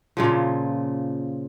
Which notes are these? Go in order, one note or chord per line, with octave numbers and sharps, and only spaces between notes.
A#2 C#3 F3